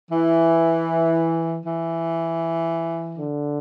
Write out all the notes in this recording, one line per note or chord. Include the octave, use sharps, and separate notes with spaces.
E3
E3
D3